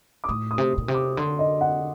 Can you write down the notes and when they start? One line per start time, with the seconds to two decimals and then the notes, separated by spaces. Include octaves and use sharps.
0.24 D6
0.28 A2 D#6
0.51 D#6
0.58 C3
0.78 A#2
0.88 C3
0.94 D6
1.17 D3 C6
1.39 D#5
1.61 F#5